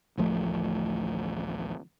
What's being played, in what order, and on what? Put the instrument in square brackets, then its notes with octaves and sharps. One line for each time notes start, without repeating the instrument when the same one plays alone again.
[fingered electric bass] A1 D2 F3 A3